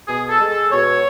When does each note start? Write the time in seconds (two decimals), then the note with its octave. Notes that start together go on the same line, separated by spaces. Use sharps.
0.08 B2 G#4
0.30 A4
0.40 G#3
0.50 A4
0.71 B2 C#5